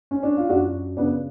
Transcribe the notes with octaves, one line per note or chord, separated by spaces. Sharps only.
C#4
D4
F4
F#2 D4 F#4
C#3 B3 D4